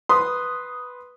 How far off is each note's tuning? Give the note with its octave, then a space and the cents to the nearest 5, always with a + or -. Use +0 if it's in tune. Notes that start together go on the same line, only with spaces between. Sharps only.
B4 +0 C6 +0 D#6 +0